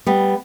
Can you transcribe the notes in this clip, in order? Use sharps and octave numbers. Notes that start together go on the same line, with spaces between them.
G3 B3